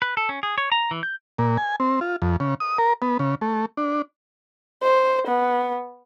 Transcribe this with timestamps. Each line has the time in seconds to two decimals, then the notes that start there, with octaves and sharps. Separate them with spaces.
0.02 B4
0.17 A4
0.29 C#4
0.43 G#4
0.58 C#5
0.72 A#5
0.91 E3
1.03 G6
1.39 A#2
1.57 G#5
1.80 C4
2.01 F4
2.22 F2
2.40 C#3
2.60 D#6
2.78 A#4
3.02 B3
3.19 C#3
3.41 A3
3.77 D4
4.83 C5
5.27 B3